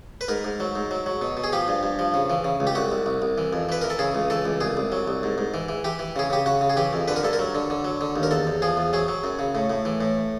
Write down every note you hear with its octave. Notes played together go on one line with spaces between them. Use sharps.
B4
G#2 A#4
G#2
F#3
G#2
F#3
F#3
B2
B2
G#4
F3 G4
G2
G2
F3
C#3
E3
C#3
C#2
G4
C2 F#4
C2
C2
C2
E3
F2
E3 B4
E3 A#4
A4
C#3 G#4
C#2
E3 A4
C#2
C2 G#4
C2
F#3
C2
G#2
G#2
E3
E3
E3 G4
E3
C#3 G#4
C#3 G4
C#3 F#4
C#3
G#4
E3 G4
F2
D3 B4
A#4
G2 A4
A#4
F#3
D3
D3
F#3
D3
D#2
A#4
E2 A4
E2
F3 G#4
E2
F#3 G#4
F#3
F#2
C#3
A2
A2
E3
A2